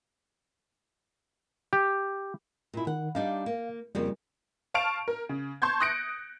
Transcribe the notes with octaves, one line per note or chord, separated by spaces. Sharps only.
G4
A#2 E4
D#3 F#5
G3 D4 D#4 F5
A#3
F2 C#3 G3 A#3
F5 A5 C#6 F6 D7 F7
A#4
C#3
A5 C6 C#6 G6 G#6
D#6 F#6 A#6 C#7 D7